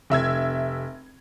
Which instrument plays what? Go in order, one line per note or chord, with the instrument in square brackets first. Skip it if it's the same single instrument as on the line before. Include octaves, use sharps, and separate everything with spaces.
[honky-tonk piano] F1 E5 E6 G#6